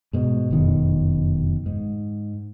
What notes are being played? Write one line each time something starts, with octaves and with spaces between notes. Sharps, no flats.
G#2 B2
F1 F#2 B2 D#3
G#2